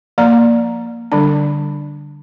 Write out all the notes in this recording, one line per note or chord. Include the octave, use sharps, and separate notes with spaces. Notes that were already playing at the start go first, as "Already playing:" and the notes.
F3 A#3 D5 A#5
D3 G3 D4